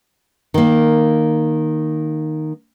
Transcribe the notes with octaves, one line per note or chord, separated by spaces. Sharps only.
D#3 A#3